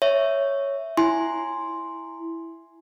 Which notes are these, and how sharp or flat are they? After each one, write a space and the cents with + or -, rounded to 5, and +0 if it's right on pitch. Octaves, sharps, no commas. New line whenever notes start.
C#5 +0 E5 +0
E4 +0 G#5 +0 C6 +0